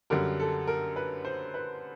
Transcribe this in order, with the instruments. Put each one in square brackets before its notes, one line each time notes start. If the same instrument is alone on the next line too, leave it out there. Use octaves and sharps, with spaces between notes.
[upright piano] F#2 D3 G3 A#4
A4
A#4
B4
C5
B4